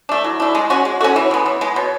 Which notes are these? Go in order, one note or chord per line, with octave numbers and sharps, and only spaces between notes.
A3 D4
F#3 E4
A3 D4 E4
G#3
C#4 F#4
G#3 G#4
C#4 F#4 A4
E3 C#5
G#3 B3
E3
G#3 B3
B2 C#5